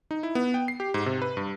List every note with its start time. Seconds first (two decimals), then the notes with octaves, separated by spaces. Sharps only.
0.11 D#4
0.23 E4
0.35 B3
0.54 G5
0.68 C7
0.80 G4
0.94 G#2
1.06 C3
1.22 B4
1.37 G2